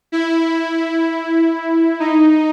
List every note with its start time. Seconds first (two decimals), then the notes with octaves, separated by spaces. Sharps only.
0.12 E4
2.00 D#4